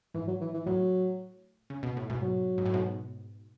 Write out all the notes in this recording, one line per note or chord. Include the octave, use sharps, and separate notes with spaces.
G#2 E3
F#3
E3
E3
A2 F#3
C#3
B2
A2
G#2 B2
F#3
G#2
A2
G#2 B2